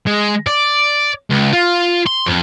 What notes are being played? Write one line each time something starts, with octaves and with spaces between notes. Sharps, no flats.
G#3
D5
C#2
F4
C6
F2